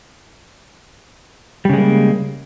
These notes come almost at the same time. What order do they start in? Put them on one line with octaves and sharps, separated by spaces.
G3 C#3 G#3 A#3